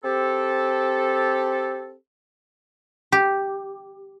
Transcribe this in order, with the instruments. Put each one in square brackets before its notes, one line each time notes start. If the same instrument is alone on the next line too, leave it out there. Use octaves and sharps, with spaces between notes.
[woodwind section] C4 G4 A4
[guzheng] G4